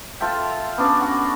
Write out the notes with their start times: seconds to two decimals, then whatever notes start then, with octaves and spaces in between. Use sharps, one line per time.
0.20 F4 A4 E5 G5
0.78 B3 C#4 D4 F#4
1.01 F#4